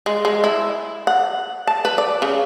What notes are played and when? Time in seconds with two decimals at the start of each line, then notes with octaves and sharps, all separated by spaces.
0.06 G#3
0.25 G#3
0.44 E4
1.07 F#5
1.67 A5
1.85 B4
1.98 D5
2.22 C#3